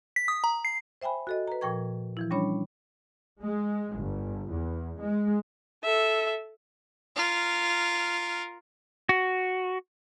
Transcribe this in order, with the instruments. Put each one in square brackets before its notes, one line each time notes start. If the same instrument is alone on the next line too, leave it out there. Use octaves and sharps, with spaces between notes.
[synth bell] B6
D#6
A#5
C7
[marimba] C5 E5 G5 G#5 B5
F#4 A4 D#5
B4 A#5
A#2 F3 A#4 G5 C#6 G#6
E3 F3 E4
G3 C#4 D4 C#5 B5
[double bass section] G#3
G1
E2
G#3
[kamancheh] A4 E5
[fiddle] F4 A#4
[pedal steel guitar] F#4